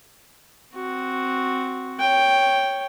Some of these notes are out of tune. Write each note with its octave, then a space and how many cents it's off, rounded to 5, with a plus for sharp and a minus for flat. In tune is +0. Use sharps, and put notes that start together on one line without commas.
C4 +0 F#4 +0
C#5 +0 G5 +0